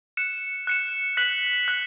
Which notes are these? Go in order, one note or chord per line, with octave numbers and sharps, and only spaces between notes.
F#6 C#7 E7
F#6 C#7 E7
F#6 B6 F#7
F#6 B6 F#7